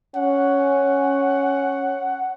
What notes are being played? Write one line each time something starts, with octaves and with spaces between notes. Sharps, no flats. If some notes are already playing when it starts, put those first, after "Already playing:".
C#4 F#5